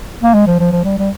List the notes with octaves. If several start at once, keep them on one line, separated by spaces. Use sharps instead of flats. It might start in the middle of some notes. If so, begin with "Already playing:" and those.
A#3
G#3
F3
F3
F3
G3
G3